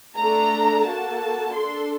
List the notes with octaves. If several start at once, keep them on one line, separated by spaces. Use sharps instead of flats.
A3 D4 A4 A#5
A#3 F#4 A4 A5
D4 A4 C6